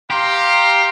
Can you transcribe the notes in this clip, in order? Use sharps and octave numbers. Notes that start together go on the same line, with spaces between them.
G4 F5 A#5 C6